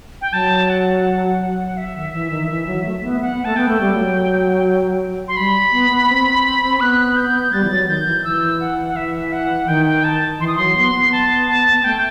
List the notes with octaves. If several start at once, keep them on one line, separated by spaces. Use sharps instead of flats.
G5
F#3 A5
F#5
E5
D#3
E3
D#3
E3
F#3
A3
B3
E5
B3 F#5
A3 A5
B3 G5
A3
G3
F#3
C6
G3 B5
B3
B3
C4
B3 F#6
G6
G3 A6
E3
F#3
D#3 G6
E3
E3 E6
F#5
F#5
E3 E5
F#5
D#3 G5
G5
A5
E3 C6
D#6
F#3 C6
B3 C6
B3
A5
A5
B3
A3 G5